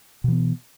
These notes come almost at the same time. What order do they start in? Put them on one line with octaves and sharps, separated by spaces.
B2 E3 B3